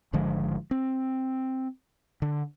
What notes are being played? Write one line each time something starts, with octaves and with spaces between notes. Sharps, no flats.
G#1 D3 F3 G#3
C4
D3